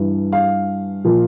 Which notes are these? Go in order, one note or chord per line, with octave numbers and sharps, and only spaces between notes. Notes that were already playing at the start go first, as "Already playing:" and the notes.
Already playing: G2 E3
F5
A#2 F3